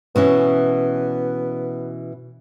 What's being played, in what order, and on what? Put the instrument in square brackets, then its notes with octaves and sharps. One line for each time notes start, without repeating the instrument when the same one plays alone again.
[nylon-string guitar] B2 E3 C#4 [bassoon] B3